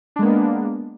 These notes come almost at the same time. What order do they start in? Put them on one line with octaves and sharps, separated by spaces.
D4 G#3 A#3 B3